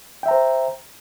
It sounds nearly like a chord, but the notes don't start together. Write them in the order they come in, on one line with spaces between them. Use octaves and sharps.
G5 E5 A#5 C5